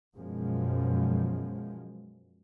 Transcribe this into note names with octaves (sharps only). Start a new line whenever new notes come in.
F#2 B2 F3 G#3